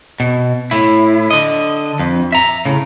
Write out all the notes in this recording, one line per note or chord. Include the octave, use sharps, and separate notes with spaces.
B2
A2 E4
D3 D#5
F2
E5 A#5
A2 C#3